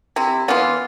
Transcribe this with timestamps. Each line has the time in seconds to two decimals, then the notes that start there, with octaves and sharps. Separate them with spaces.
0.16 C3 E4
0.48 E3 B3 F4